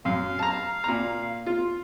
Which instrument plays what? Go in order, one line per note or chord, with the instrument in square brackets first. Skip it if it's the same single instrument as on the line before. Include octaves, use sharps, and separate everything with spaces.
[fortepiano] F#2 [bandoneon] F5
[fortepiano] A5 A#5
A#2 A#5
F4